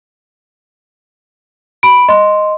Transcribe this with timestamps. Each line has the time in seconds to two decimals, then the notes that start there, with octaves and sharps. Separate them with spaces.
1.83 B5 D7
2.09 D#5 C6